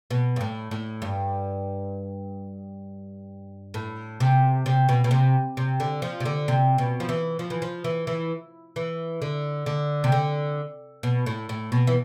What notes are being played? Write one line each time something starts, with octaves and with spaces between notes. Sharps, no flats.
B2
G2
A2
A2
G2
A2
C3
C3
B2
B2
C3
C3
D3
F3
C3
D3
C3
B2
F3
E3
F3
E3
F3
E3
E3
E3
D3
D3
C3
D3
B2
A2
A2
B2
E3